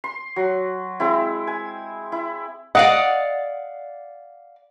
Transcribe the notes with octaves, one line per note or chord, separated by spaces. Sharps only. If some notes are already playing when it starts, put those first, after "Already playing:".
C6
F#3
G#3 C4 E4
G#5
E4
D5 D#5 F5 F#5